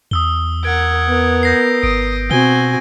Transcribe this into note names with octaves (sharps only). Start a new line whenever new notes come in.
E2 D#6 E6 G7
A#4 F#5 G#6 D7
B3 A#4
G6 A#6 C7
G#1 D#6 D7
B2 C4 F#4 G#5 G7